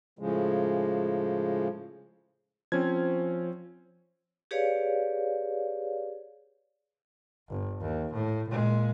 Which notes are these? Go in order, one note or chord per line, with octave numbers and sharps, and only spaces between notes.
A2 C#3 F3 G#3
F3 C4 C#4 G#6
G4 G#4 B4 C#5 D5 F5
G1
D#2
A2
A#2 G#3